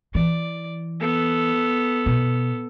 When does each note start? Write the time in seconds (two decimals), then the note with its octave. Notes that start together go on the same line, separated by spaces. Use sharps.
0.15 E3 D5
1.00 B3 A4
2.06 B2